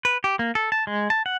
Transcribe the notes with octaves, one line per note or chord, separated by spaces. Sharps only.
B4
G4
A#3
A4
A5
G#3
A5
F#5